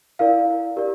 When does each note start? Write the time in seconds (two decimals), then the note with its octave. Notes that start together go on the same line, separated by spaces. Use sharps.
0.19 E4 A#4 D5 F5
0.77 G4 A#4 D5